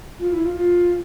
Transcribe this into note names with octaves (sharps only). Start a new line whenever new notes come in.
F4
E4
F4
F4